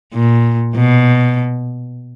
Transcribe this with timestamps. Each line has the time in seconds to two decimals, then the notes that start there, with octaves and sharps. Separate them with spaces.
0.14 A#2
0.75 B2